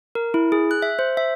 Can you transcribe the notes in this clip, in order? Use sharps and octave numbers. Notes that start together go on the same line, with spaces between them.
A#4
E4
G#4
F#6
E5
C5
E5